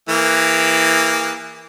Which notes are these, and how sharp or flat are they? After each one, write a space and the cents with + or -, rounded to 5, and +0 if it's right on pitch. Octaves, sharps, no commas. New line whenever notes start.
E3 +0 A#3 -5 G#4 -45